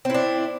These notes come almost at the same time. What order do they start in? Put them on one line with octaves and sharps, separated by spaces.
C4 E4 D4